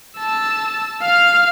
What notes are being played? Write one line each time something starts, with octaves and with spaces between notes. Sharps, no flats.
A5 E6
F5 F6